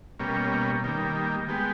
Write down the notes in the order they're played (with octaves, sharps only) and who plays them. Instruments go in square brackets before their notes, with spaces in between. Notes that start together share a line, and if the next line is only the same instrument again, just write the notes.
[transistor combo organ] B2 G3 A#3 C#4
D#3 G3 A#3
G#3 B3 G4